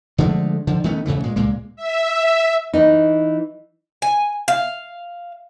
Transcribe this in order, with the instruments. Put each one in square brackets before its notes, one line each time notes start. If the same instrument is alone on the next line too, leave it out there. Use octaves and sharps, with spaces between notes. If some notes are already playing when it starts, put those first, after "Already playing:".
[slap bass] D3 F3 G#3 A3
D3 F3
D#3 A3 B3 C#4
G#2 C#3 E3 A3
A#2 G#3
C#2 A#2 G#3 A#3
[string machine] E5
[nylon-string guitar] E3 D#4
[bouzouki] G#5
F5